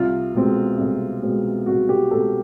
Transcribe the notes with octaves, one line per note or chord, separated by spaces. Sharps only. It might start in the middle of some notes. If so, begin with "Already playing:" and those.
Already playing: C2 F4
B2 G#3 C4
C2
B2 G#3 C4
C2 F#4
G4
B2 G#3 C4 A4